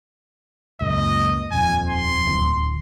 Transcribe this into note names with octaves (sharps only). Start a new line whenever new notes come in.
C#2 F#2 A#2 D#5
D#1 F2 G#5
C6
D1